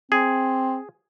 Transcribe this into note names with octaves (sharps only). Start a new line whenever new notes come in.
C4 G#4